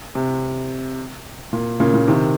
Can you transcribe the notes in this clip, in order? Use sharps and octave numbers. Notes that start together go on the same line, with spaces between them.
C3
A#2
A#2 C#3
A#2 C#3
C3 D#3